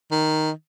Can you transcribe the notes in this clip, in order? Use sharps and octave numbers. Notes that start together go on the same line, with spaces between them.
D#3